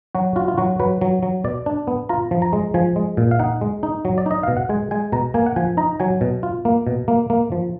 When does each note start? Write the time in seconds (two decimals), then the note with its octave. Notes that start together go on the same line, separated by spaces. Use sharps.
0.15 F#3 F#4
0.36 F4 F#4
0.48 F4
0.58 F#3 F#4
0.79 F#3 B4
1.01 F#3
1.23 F#3
1.44 B2 D5
1.66 D4
1.87 B3
2.09 F4 A#5
2.31 F3
2.42 A#5
2.53 G#3
2.74 F3 G#5
2.96 G#3
3.17 A#2
3.31 F5
3.40 D#4 F#5
3.61 G#3
3.83 D#4
4.05 F#3
4.18 D5
4.26 D#4 D#5
4.43 B2 F5
4.57 F#5
4.69 G#3 G#5
4.91 G#3 G#5
5.12 B2 A#5
5.34 A#3 G#5
5.46 F#5
5.56 F3 G#5
5.77 D#4 A#5
6.00 F#3 G#5
6.21 B2
6.43 F4
6.65 A#3
6.87 B2
7.08 A#3
7.30 A#3
7.52 F3